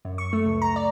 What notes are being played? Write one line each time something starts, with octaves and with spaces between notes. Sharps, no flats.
F#2
C#6
A3
C#2
A#5
D5